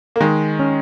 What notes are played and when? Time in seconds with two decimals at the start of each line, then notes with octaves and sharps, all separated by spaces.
0.16 A#3
0.21 D#3 G#3
0.59 C#4